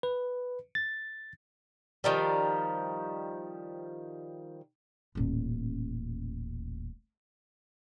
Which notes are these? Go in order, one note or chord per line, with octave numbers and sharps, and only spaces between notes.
B4
A6
D#3 F3 G3
D#1 A1